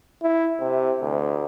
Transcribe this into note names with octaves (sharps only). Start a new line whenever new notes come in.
E4
C3
D2